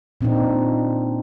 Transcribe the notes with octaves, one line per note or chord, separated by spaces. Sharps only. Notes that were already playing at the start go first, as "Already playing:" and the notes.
A#2 C4 D4 D#4